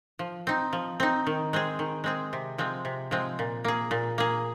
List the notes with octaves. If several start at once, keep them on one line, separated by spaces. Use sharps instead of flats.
F3
C4 D#4
F3
C4 D#4
D#3
G#3 C4 G#4
D#3
G#3 C4 G#4
C3
F3 G#3 C4
C3
F3 G#3 C4
A#2
A#3 G#4
A#2
A#3 G#4